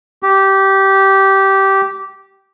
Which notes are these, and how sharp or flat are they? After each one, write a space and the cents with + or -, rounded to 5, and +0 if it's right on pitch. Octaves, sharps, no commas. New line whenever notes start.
G4 -15